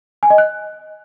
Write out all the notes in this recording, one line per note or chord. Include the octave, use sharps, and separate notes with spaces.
G#5
D#5
F#6